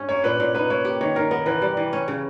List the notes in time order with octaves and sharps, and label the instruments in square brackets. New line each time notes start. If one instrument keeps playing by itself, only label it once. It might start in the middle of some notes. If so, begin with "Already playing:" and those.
Already playing: [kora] G2 C#4
[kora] A#3 [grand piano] C#5
[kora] A#2 [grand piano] B4
[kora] A#2
[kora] D#4 [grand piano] B4
[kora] A#3 [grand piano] C#5
[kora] G4
[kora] D#3 [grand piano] C#5
[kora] D#3 [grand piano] A#4
[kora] B3 [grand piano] A#4
[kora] E3 [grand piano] B4
[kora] G3
E3
C#4
C#3